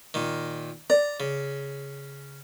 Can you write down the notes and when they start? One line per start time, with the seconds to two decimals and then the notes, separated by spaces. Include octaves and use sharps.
0.14 A#2 D#3
0.90 D5 A#5
1.20 C#3